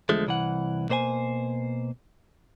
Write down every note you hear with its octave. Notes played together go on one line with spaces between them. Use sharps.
E2 D3 F3 G#3 A3
C2 E3 F#5
B2 A#3 C5 G5 G#5